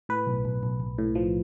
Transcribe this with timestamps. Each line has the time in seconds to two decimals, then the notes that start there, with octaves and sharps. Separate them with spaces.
0.09 A2 B4
0.27 B1
0.45 B1
0.63 B1
0.80 B1
0.98 A2
1.15 F3